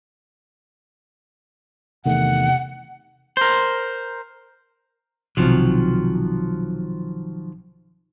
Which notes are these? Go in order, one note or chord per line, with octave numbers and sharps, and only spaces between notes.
E2 C3 D#3 A3 F#5
A#4 C5
B1 C3 D#3 F3 F#3